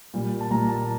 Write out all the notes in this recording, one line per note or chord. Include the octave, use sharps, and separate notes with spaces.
A#2 G3
A5
A#2 G3 A#5
A5